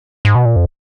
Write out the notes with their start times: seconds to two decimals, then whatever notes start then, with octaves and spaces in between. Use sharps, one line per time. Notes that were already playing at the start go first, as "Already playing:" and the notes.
0.25 G#2
0.35 B2
0.46 A#2
0.56 F2